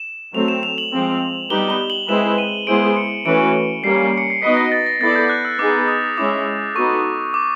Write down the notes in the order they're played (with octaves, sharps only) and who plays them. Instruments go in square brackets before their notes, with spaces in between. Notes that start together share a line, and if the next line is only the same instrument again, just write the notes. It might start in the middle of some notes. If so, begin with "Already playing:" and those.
Already playing: [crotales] E7
[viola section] F#3 A3 C4 [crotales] F7
[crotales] E7
F7
F#7
[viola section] F3 G#3 C4
[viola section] G3 B3 D#4 G4 B4 [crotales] G7
[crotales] G7
F#7
[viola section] G#3 C4 E4 G#4 B4 [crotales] E7
[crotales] D#7
[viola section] G#3 B3 E4 G#4 C5 [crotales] D7
[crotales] C#7
[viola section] E3 A3 C#4 F#4 B4 [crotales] D7
[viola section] G3 A#3 C#4 [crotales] C7
[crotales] C#7
C7
[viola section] B3 D#4 F#4 B4 D#5 [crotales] B6
[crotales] A#6
A6
A#6
[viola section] B3 E4 A4 D5 [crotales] A6
[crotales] G6
F#6
E6
[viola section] B3 D#4 G#4 B4 [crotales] D6
[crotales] D#6
[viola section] G#3 C#4 E4 [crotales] D6
[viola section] B3 D#4 F#4 A4 [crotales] C#6
[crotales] D6